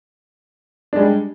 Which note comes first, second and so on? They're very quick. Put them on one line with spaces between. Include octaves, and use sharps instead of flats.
D4 G#3 G3